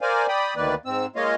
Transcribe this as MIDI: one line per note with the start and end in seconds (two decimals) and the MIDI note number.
0.01 0.26 70
0.01 0.26 72
0.01 0.26 74
0.01 0.26 77
0.01 0.26 80
0.28 0.54 74
0.28 0.54 79
0.28 0.54 83
0.28 0.54 87
0.56 0.74 38
0.56 0.74 51
0.56 0.74 58
0.56 0.74 71
0.56 0.74 74
0.86 1.06 44
0.86 1.06 60
0.86 1.06 88
1.16 1.35 56
1.16 1.35 58
1.16 1.35 65
1.16 1.35 73
1.16 1.35 75
1.16 1.35 77